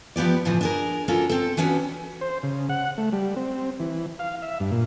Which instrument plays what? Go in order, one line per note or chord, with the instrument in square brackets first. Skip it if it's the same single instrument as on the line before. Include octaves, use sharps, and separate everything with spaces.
[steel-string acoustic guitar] F3 B3 G4 D5
A2 C#3 E3 F3
D4 G#4 A#4
C#4 D4 F4 F#4 A4 A#4
C4 A4
E3 B3 C#4 D4 F#4
[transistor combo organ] C5
C#3
F#5
A3
G3
C4
E3
F5
E5
G2
A#2